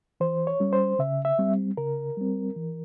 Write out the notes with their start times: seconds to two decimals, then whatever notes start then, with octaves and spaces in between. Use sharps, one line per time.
0.20 E3 C5
0.47 C#5
0.60 G3 C#4
0.73 C5
0.99 C#3 E5
1.25 E5
1.39 G3 C4
1.77 C#3 A#4
2.17 G3 C4
2.56 E3